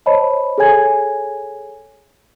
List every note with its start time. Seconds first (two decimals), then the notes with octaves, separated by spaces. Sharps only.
0.06 C5 C#5 D#5 A5 B5
0.58 G#4 A4 C#5 G#5 G#6